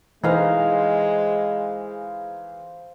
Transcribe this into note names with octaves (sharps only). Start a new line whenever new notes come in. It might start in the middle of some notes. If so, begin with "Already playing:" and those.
E3 G#3 D#4 C5 F5 A#5